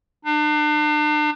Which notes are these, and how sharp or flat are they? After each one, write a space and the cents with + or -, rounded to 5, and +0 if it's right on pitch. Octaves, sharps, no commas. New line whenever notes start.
D4 +40